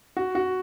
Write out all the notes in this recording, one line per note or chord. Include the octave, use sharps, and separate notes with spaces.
F#4
F#4